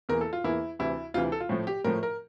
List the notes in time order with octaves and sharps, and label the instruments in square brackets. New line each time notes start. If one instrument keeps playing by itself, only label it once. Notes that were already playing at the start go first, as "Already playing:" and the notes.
[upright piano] E2 E3 A#3 A#4
A4
F4
E2 E3 A#3 E4
D2 C3 E3 E4
D2 C3 E3 F4
A4
F4
A2 F3 A3
G4
A2 F3 A3 A#4
A#4